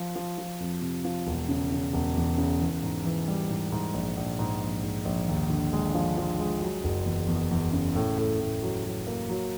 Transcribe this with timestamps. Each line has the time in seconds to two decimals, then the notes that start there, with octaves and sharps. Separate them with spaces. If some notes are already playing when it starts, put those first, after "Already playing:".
Already playing: F3
0.16 F3
0.38 F3
0.60 F2
0.82 C3
1.05 F3
1.27 E1
1.49 C#3
1.72 C#3
1.94 E1
2.16 E2
2.38 C#3
2.61 E3
2.83 G#2
3.05 E3
3.28 G3
3.49 G#2
3.72 G#2
3.94 A#1
4.17 A#1
4.39 G#2
4.62 A#1
4.83 G#2
5.05 A#1
5.28 D#2
5.50 D3
5.73 G#3
5.95 F3
6.17 F3
6.40 G#3
6.62 F#3
6.84 F#1
7.06 E2
7.28 E2
7.51 E2
7.73 C#3
7.95 A2
8.18 A2
8.40 A2
8.62 F#3
8.85 F#3
9.07 A#3
9.29 F#3